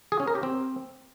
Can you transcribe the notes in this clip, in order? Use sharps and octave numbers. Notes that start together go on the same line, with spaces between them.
G#4
C#4
A#4
G4
C4